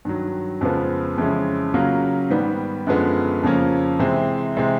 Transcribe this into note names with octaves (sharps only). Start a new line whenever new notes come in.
G2 D#3 F#3
F2 C#3 F3 G#3 B3
F2 C#3 E3 G#3 C#4
C#3 F#3 A#3 C#4 F4
G#2 D#3 G3 B3
F#2 D3 F3 G#3 B3
F2 C#3 F3 A#3 C#4
C3 E3 G#3 C4
C3 E3 G#3 C4